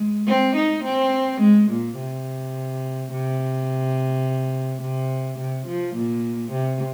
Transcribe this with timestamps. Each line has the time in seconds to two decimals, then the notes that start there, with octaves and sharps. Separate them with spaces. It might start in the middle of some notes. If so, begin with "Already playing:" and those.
Already playing: G#3
0.27 C4
0.56 D#4
0.84 C4
1.41 G#3
1.70 A#2
1.98 C3
3.12 C3
4.82 C3
5.39 C3
5.67 F3
5.95 A#2
6.51 C3